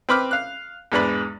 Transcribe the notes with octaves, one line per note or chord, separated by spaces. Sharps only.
C4 B4 B5 D6 F6
F5 F#6
E2 G#2 D4 B4 B5